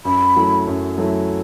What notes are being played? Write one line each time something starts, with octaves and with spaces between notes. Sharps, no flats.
F#2 B5
F#3 A3 E4
F#2
F#3 A3 E4